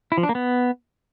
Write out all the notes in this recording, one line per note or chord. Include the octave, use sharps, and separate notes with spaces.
E4
F3
D4
A#3
B3